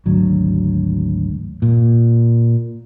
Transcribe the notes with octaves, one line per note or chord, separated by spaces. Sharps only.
G#1 D2 F#3
A#2